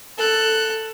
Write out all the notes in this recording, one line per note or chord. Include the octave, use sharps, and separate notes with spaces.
A4 F#6